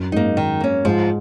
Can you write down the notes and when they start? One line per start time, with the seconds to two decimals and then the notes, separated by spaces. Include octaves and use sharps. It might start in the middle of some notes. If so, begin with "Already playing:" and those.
Already playing: F#2
0.12 G#2 A#3 D#4
0.37 D#3
0.60 A#3 C#4
0.85 G#2 F3